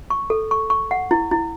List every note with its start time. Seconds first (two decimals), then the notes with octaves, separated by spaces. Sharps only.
0.10 C#6
0.30 A4
0.51 C#6
0.70 C#6
0.91 F#5
1.11 E4
1.31 E4